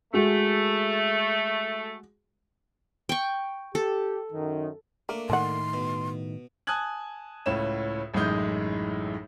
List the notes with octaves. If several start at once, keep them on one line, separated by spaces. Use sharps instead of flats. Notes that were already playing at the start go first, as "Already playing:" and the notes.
G#3 A3 F#4
G5 C#6
G4 A4
F#2 D#3
A3 A#3 D4 A#4
A2 D#3 F#5 A5 C6
B2
G#5 A5 D#6 F#6 G#6 F#7
C#2 A2 C#4 E7
A1 F#2 A2 G#3 D#4 G6